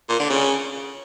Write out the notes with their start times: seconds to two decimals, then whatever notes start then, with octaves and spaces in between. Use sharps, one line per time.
0.09 A#2
0.19 D3
0.30 C#3